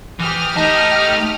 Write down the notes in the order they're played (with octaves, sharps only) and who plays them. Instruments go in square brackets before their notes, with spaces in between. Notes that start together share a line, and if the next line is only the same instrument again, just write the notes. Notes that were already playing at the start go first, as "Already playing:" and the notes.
[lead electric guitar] E3 [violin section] G4 D#6 F6
[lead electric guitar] A3 A5 [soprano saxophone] D#4